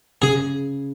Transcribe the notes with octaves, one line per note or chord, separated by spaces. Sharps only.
C#3 G#4